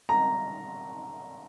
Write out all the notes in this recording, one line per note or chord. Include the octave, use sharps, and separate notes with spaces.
A#5